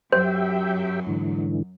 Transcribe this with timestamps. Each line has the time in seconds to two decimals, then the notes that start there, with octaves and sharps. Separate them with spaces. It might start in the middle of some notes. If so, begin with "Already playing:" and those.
0.12 F#2 F#3 G4 C5 E5 G5
1.07 G#2 D3 E3